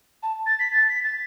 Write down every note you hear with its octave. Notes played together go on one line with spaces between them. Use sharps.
A5
A6
B6
A6
B6
A6